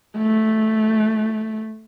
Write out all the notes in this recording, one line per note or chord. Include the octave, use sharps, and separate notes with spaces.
A3